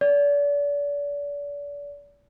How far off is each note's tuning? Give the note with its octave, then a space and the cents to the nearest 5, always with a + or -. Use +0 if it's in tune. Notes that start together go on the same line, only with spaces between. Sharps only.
D5 -35